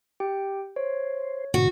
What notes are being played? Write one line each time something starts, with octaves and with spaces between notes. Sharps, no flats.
G4 G5
C5 C#5
G#2 B2 D3 F#4